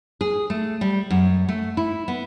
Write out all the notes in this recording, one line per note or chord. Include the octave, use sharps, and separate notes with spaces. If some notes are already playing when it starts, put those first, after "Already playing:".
G#4
A3
G3
F#2
A3
E4
B3